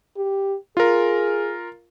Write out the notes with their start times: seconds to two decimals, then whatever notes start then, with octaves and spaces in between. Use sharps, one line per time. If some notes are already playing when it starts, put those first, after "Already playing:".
0.17 G4
0.77 F4 G#4 A#4